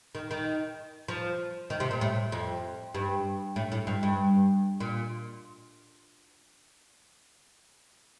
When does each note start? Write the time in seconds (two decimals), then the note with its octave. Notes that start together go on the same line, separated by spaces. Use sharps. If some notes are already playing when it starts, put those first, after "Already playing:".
0.15 D#3
0.31 D#3
1.08 F3
1.70 D#3
1.80 C3
1.91 A#2
2.01 A2
2.32 F2
2.95 G2
3.56 A2
3.72 A2
3.87 G2
4.03 G2
4.80 A#2